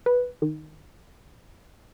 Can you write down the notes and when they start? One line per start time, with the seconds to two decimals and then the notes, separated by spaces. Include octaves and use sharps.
0.06 B4
0.42 D#3